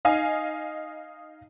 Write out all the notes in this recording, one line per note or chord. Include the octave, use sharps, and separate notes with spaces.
D#4 D#5 F5 G#5